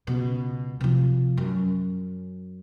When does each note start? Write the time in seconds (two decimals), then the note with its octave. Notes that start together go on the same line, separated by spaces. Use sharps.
0.07 C#2 B2
0.81 C3 F3
1.37 F#2